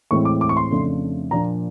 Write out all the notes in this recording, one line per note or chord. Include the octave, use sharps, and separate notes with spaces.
A2 E3 G#3 C4 C#6
D6
D6
C#6
C6
F2 C#3 F3 A3 D4
A#2 F3 A#3 D4 A#5